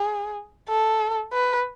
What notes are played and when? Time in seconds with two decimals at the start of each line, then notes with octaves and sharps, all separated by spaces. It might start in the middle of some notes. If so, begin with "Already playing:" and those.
Already playing: G#4
0.69 A4
1.33 B4